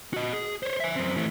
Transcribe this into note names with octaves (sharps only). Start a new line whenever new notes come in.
F#4 D#5
G#4
C5 C#5
E5 G#5
F#2 C4
E3 A3